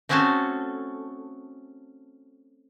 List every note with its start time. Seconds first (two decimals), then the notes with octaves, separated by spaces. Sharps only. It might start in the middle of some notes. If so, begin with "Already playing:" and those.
0.09 A3 C4 C#4 F#4 G#4 A4